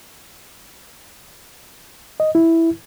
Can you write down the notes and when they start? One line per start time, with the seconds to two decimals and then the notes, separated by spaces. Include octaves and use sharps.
2.20 D#5
2.35 E4